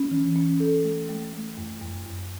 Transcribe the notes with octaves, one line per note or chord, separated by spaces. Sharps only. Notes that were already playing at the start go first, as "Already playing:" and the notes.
Already playing: C#4
E3
C#4
A4
A3
A3
A3
F#2
F#2
F#2